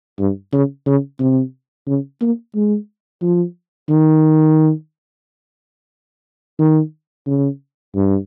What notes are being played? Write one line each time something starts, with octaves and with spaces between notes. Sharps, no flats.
G2
C#3
C#3
C3
C#3
A#3
G#3
F3
D#3
D#3
C#3
G2